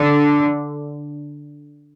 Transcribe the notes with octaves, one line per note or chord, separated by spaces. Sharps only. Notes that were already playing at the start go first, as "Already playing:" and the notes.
Already playing: D3